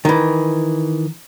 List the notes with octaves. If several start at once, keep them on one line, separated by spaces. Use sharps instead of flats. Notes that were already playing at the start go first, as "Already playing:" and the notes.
D#3 E3